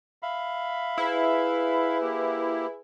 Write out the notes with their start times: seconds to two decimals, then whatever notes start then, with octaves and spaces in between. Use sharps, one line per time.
0.23 E5 F5 B5
0.98 E4 G#4 B4
2.02 A#3 G4